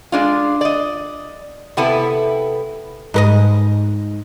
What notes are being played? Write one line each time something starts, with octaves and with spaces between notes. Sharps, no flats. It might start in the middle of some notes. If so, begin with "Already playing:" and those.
G#3 D4 F4
D5 D#5
C3 B3 E4 A4
G#2 A#4 D#5